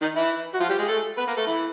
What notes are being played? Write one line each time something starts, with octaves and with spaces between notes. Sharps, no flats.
D#3 D#4
E3 E4
F#4
F3 F4
G3 G4
G#3 G#4
A3 A4
B3 B4
A#3 A#4
A3 A4
E3 E4